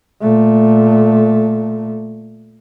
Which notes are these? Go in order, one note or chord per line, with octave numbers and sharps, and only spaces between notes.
A#2 A3